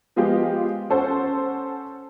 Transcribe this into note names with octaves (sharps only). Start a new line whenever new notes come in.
F3 G#3 B3 F4 G4
C#4 A4 C5 F#5